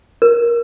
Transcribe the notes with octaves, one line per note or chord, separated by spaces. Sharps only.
A#4